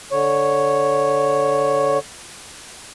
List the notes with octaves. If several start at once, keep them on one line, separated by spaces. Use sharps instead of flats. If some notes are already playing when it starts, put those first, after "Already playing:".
D3 C#5